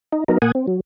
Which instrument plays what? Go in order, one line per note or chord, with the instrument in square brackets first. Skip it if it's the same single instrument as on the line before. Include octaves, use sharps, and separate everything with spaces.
[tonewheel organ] D#4
F#3 B3 D#4 A#4
A#2 A#3 F#5 G#5 D#6
C4
F#3